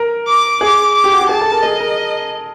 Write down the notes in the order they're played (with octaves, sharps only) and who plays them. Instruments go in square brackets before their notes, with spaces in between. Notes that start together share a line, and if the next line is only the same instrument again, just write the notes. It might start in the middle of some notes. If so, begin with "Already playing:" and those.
Already playing: [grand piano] A#4
[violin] D6
[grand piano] G#4 [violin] D6
[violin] D6
[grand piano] G4
F#4
G4
[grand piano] G#4 [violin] A5
[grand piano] A4
A#4
[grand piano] G#4 [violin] D#5
[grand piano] A#4